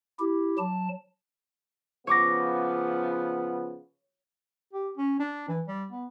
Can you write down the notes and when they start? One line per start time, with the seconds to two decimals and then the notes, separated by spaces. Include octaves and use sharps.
0.19 E4 G4
0.58 F#3 A5
2.07 C#3 F3 B3 C#5 D6 A#6
4.73 G4
4.97 C#4
5.19 D4
5.48 E3
5.67 G3
5.92 B3